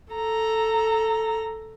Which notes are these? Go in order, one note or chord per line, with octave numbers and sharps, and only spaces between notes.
A4 A#5